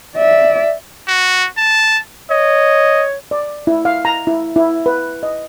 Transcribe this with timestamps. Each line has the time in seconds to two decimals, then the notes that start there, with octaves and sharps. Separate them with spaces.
0.17 D5 E5
1.08 F#4
1.57 A5
2.30 C#5 D#5
3.31 D5
3.67 E4
3.85 F5
4.05 A#5
4.27 E4
4.56 E4
4.86 B4
5.23 D#5